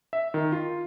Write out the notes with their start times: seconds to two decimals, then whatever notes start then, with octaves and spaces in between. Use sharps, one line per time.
0.13 E5
0.34 D#3
0.52 F4